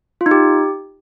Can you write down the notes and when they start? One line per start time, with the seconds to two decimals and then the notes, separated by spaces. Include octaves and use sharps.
0.21 F4
0.26 D#4
0.31 G4